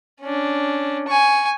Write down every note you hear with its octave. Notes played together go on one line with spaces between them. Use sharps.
C#4 D4
G#5 C#6